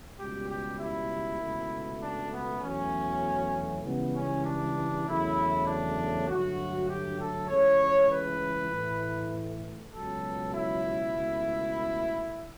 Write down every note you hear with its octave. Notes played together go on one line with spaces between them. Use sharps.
C#2 B2 G3 G4
G4
E4
C#2 B2 A3
D4
B3
E2 B2 F#3 A3 C#4
C#2 C#3 E3 G3 B3
C#4
D4
E2 C#3 F#3 A3 E4
D4
G2 D3 F#3 A3 F#4
G4
A4
C#2 C#3 E3 A3 C#5
B4
A2 E3 A3
C#2 B2 F#3 A4
E4
C#2 B2 A3